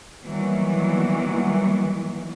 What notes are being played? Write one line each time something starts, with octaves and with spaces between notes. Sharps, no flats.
D#3 E3 F#3 G3 A#3 B3